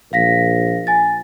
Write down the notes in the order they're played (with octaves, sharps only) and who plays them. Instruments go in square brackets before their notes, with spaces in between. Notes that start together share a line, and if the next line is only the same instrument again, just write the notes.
[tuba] A#1 [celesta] F5 A#6 B6
[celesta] G#5 A6